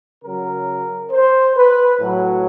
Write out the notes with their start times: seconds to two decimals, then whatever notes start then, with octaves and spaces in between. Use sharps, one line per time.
0.24 C#3 F#3 A#4
1.11 C5
1.56 B4
1.99 A2 F#3